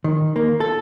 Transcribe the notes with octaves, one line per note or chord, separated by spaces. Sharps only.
D#3
A#3
A4